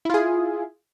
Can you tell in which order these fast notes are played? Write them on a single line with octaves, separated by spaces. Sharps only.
E4 F4 G#4